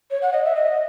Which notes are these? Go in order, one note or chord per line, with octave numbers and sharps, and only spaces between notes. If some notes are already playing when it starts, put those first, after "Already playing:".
C#5
F#5
D#5
E5
D#5